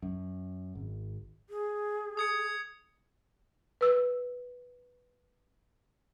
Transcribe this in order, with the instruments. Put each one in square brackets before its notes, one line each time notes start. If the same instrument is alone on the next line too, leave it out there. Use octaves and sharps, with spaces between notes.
[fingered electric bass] F#2
G#1
[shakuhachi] G#4
[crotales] D#6 G#6 C#7
[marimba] B4 E6